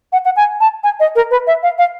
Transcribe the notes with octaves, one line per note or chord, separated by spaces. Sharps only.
F#5
F#5
G#5
A5
G#5
D#5
A#4
B4
E5
F5
F5